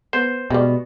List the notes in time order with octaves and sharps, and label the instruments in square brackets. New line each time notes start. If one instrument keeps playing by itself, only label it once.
[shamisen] B3 [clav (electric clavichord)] C5
[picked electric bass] B2 [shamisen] G3 G#3